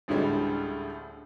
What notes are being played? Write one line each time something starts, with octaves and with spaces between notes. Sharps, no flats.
A1 D2 A2 D3 G3 G#3